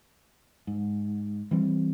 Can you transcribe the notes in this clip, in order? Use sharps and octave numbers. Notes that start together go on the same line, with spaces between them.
G#2
E3 G3 C4